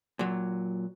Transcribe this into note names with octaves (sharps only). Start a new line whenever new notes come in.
A#2 F#3